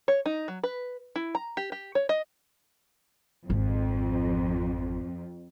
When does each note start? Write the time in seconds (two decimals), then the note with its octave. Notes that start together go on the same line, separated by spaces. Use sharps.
0.08 C#5
0.26 D#4
0.48 F#3
0.63 B4
1.16 E4
1.35 A#5
1.57 G4
1.72 G4
1.95 C#5
2.09 D#5
3.50 G#1 F2